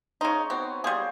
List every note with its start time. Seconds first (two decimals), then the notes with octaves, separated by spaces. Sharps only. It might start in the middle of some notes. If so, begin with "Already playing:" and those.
0.21 C#3 D#4 C#5 A#5 C6
0.50 B3 C4 F#4
0.84 G3 A#3 G#4 C5